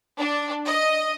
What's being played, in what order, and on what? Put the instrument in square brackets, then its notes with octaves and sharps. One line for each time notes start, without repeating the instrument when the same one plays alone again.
[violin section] D4
D#5